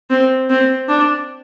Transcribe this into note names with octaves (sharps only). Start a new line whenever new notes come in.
C4
C4
D4